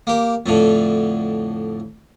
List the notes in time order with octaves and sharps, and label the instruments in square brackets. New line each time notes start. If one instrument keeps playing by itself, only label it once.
[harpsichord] A#3 G4
F2 A2 D3